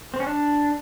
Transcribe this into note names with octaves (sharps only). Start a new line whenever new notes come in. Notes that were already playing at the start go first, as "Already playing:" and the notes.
C4
C#4
D4